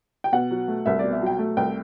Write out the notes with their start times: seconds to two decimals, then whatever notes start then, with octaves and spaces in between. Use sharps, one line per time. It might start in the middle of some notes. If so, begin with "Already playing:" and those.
0.24 G5
0.32 B2 F#5
0.51 F#3
0.68 A3
0.86 C2 E5
0.99 B2 D5
1.12 E5
1.22 F#3 G5
1.39 A3
1.57 C2 G5